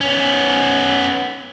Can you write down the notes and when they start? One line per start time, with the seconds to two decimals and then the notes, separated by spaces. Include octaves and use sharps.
0.01 B3 C#4